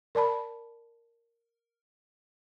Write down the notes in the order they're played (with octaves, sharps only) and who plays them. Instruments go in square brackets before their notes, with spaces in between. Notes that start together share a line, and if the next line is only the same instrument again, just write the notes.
[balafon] A#4 D5 A5 B5